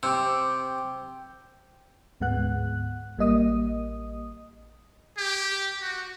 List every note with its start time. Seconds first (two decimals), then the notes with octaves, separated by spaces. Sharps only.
0.03 C3 G5 D6 E6
2.20 D2 G#2 G#3 B3 F#5 F#6
3.18 A1 G3 A#3 D#5 D#6
5.17 G4
5.81 F#4